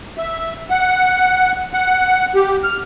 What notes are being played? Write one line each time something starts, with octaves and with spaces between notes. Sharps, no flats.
E5
F#5
F#5
G4
F6